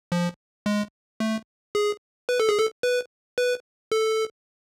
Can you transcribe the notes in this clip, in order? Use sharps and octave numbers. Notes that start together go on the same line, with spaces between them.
F3
G#3
A3
G#4
B4
A4
G#4
A4
B4
B4
A4